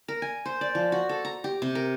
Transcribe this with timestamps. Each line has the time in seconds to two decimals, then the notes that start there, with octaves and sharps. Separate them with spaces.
0.08 A#4
0.22 G#5
0.45 C5
0.61 D5
0.75 F3
0.92 F#4
1.09 A4
1.25 A#5
1.44 G4
1.62 C3
1.75 A#4